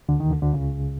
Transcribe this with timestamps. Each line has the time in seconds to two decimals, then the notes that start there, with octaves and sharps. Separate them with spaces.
0.09 D2 D3
0.20 D#2 D#3
0.31 D2 D3
0.42 D2 D3
0.53 C#2 C#3